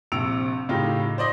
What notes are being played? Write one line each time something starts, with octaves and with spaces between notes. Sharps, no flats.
A#1 C3 E6 C#7 D7 F7
A2 C#3 D#4 F4 G4
C5 D5 D#5